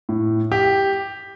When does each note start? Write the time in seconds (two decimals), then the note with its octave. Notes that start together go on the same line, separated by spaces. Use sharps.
0.09 A2
0.52 G4